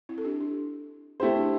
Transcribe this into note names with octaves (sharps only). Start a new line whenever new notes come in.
C4 E4
A4
D4 G4
D4
A3 C4 E4 G4 C5
D4